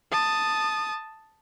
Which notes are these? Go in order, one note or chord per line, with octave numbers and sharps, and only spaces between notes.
A5 D#6